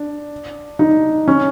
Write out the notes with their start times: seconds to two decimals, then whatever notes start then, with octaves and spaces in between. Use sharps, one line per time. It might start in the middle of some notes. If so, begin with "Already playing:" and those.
Already playing: D4
0.79 D#4
1.28 C#4